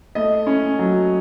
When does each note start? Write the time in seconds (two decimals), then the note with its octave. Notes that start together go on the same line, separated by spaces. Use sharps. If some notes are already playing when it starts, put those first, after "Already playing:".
0.15 A3 D#5
0.47 C#4
0.79 F#3